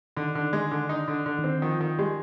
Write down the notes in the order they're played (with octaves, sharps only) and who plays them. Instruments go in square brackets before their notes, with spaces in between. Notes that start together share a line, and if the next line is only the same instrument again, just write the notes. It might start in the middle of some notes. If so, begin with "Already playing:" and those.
[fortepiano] D3 [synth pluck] D#3 D#4
[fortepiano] D3
[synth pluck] D4
[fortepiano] G#3
[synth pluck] D4
[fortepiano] D3
[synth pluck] D4 [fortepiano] D#4
[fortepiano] D3
[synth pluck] D4
[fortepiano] D3
[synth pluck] D#3 D#4
[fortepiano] C4
[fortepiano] D#3 [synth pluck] F3 F4
[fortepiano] D#3
[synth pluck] G3 G4 [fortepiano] G#3